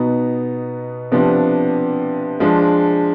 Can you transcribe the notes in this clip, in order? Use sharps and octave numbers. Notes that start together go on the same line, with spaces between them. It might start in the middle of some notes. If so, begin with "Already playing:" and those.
Already playing: B2 B3 D#4
C3 F3 B3 D4
F3 G#3 D4